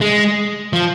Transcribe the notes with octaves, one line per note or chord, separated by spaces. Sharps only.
G#3
F3